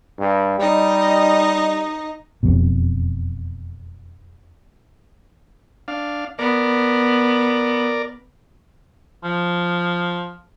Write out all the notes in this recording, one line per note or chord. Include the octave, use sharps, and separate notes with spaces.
G2
G3 D#4 D#5
E1 F2 B2
D4 F5
B3 A#4 D5
F3